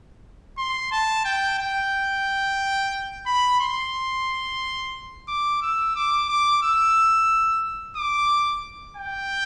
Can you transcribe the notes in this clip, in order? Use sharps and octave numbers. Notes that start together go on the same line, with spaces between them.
C6
A5
G5
G5
B5
C6
D6
E6
D6
D6
E6
D6
G5